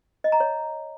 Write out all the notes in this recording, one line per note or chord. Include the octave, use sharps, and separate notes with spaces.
D#5
A#5
C#5